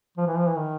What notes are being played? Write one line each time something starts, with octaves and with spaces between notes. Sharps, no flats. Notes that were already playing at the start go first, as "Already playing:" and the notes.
F3
E3
F3
E3
D#3